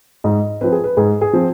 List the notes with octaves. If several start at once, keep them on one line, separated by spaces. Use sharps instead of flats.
G#2 D#5
F3 C4 B4
G#4
B4
G#2 G#4
G#4
F3 C4